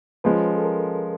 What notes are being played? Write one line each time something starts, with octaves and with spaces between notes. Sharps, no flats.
F3 G#3 C#4 B4
A4
A#4